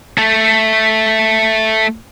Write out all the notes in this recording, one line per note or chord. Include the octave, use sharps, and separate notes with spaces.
A3 A4